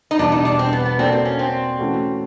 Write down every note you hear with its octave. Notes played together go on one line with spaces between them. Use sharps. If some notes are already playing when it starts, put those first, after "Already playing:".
D#4
E2 B2 G3 D4
D#4
D4
C4
B3
B3
A#3 C4 D4 F#4 A4 D5
C4
C#4
C4
E3 A3 C#4 F#4 A4